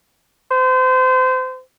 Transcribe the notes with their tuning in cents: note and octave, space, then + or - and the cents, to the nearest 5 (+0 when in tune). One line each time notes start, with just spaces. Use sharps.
C5 -30